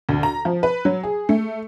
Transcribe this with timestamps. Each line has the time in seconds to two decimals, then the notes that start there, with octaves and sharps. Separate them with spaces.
0.09 D2
0.23 A#5
0.45 F3
0.63 B4
0.85 F#3
1.03 G#4
1.29 A3